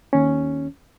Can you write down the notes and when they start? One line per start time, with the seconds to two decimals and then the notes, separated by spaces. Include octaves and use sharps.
0.13 D#2 C#4